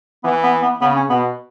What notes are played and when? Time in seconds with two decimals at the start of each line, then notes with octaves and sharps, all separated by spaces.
0.24 E3 B3
0.43 B3
0.62 B3
0.81 C#3 B3
0.96 C#4
1.09 B2 B3